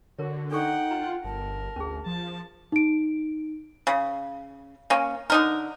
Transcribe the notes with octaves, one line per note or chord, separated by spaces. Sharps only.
D3 F#4 A#4 C#5
D4 D#4 A4 F#5 G5 C#6
F4 A#5
G1 A#4 A5
D2 C#4 G#4
F3 A5
D#4 D7
C#3
A#3 C#4
D3 D#4 A#4